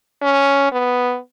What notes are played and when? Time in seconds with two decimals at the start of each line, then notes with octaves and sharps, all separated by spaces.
0.22 C#4
0.72 B3